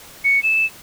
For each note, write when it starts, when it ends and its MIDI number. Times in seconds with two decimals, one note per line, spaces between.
0.24 0.42 97
0.43 0.66 100